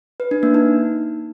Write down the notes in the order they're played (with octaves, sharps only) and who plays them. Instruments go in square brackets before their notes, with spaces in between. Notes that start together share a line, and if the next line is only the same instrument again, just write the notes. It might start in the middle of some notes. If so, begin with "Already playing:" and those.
[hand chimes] B4
D4
A#3
D#4